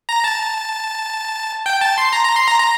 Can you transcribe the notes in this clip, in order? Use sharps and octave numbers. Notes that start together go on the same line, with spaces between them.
A#5
A5
G5
A5
C6
A#5
A#5
C6
A#5
A#5